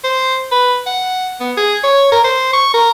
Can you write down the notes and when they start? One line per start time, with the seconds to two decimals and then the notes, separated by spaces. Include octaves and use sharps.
0.04 C5
0.52 B4
0.86 F#5
1.40 B3
1.57 G#4
1.84 C#5
2.12 A#4
2.24 C5
2.53 C#6
2.74 A#4